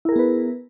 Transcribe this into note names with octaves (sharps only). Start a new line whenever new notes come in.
B3 E4 G#4 A#4 B4